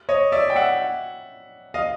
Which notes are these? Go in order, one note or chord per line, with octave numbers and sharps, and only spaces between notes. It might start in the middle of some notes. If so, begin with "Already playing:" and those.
C#5 D#5
D5 E5
G5
E5 F#5
D#5 F5